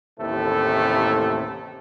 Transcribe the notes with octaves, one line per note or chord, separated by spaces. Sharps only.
A1 D#2 A2 C3 A3